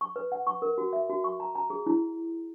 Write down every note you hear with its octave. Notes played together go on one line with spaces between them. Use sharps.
C#6
B4
F#5
C#6
A#4
F#4
E5
F#4
C#6
A#5
A#5
G#4
E4